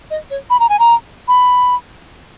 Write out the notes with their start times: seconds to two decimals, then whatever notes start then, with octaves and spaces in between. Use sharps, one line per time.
0.10 D#5
0.30 C#5
0.50 B5
0.60 A#5
0.69 G#5
0.79 A#5
1.28 B5